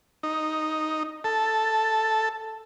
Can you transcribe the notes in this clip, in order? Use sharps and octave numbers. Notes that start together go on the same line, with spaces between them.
D#4
A4